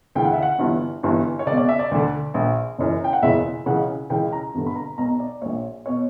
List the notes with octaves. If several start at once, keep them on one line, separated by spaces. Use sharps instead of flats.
D2 C#3 E3 G5
F#5
E5
F#5
G1 G2 E3
G1 G2 E3
C#5
C#2 D5
B2
D5
E5
D5
D2 D3
A#1 A#2
F#1 F#2 E3
G5
F#5
F#1 E2 C#3 E3 E5
C#2 C#3 E3 F#5
C#2 C#3 E3 G5
A#5
G1 G2 D3
B5
A#5
B1 B2 A#5
D5
A#1 A#2 C#5
B2 C#5